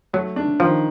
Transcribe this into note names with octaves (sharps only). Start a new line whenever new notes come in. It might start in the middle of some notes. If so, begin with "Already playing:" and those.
F#3 A3
D4
D#3 F3